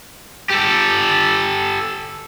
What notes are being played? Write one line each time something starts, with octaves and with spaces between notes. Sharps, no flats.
G4 A4